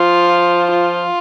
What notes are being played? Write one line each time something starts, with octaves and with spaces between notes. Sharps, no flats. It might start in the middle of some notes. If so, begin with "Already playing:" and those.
Already playing: F3 F4
F4